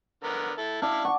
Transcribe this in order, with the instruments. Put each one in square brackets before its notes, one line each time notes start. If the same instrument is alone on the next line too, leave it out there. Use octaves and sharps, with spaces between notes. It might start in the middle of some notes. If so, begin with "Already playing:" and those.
[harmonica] D3 B3 A#4
E4 A4
[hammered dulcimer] D4 [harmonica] E4 F5
[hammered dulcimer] F#5 D6 [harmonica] C#6